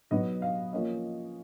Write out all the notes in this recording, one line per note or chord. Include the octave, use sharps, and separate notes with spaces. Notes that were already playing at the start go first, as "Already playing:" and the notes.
B2 F#3 B3 D#4 D#5
F5
F3 A#3 C#4 D#5